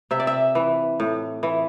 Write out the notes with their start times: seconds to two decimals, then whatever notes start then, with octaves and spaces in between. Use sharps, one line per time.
0.11 C3 E5
0.20 D5
0.27 E5
0.55 E3
1.00 A2
1.43 E3